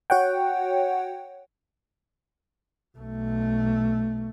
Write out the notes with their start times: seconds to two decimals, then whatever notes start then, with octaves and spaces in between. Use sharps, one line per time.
0.10 F#4 C#5 F#5 G5
2.97 B1 A3